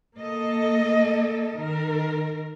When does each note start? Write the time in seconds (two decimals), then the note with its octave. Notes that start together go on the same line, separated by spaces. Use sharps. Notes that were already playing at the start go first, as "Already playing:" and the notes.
0.16 A#3 A4 D#5
1.57 D#3 A#4